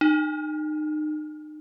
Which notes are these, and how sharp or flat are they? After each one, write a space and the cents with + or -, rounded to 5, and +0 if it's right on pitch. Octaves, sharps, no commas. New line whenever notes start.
D#4 -30